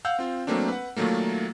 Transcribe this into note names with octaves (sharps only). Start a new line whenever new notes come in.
F5 F#5 E6 G6
C4 F4
F#3 A3 A#3 C4 D4
B4 F#5
A#2 D#3 F#3 A3 A#3